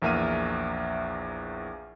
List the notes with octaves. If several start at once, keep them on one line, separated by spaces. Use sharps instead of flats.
A#1 E2 A#3 E5 F6 D#7